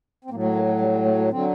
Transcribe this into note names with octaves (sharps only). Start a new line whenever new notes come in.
C4
A2 F#3 A#3
A3
A#3
A3
G3
G3
A3
A3
D3 F#3 C4